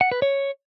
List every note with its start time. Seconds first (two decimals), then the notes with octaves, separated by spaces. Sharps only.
0.01 F#5
0.12 B4
0.22 C#5